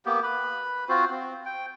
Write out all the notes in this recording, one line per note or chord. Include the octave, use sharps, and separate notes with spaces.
A#3 B3 G4
B4 B5
C4 F4 F#4 C5
C4
G5